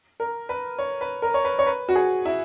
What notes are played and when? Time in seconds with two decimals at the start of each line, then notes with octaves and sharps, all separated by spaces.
0.20 A#4
0.49 B4
0.78 C#5
1.01 B4
1.22 A#4
1.34 C#5
1.45 B4
1.59 C#5
1.66 B4
1.89 F#4
1.95 G#4
2.25 E4